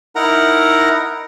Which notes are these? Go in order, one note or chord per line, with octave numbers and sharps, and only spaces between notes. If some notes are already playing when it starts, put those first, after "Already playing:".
D#4 E4 A#4 F#5 A#5